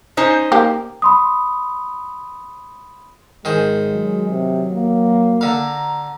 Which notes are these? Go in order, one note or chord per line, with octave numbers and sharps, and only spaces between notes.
C#4 D#4 C5
A#3 G4
B5 C6 D#6
G#1 D#3 G#3 G#4 C5
F#3
C3
A#3
D3 F5 A#5